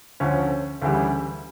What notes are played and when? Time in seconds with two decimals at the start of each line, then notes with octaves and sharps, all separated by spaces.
0.20 D2 D3 F3 C#4
0.82 D2 C#3 E3 G3